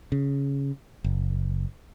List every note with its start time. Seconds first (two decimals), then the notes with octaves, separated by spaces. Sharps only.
0.12 C#3
1.04 F#1